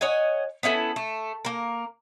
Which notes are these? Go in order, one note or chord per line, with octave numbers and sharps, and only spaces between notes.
C#5 D#5 F#5 G#5
B3 C#4 E4 A4
A3
A#3 A#4